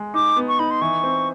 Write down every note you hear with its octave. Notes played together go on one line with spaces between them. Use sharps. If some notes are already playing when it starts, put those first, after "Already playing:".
Already playing: G#3
D#4 D6
B3
C#6
D#4 B5
C6
E3 C#6
C4